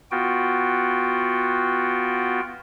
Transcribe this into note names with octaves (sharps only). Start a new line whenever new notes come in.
B3 F4 F#4 G5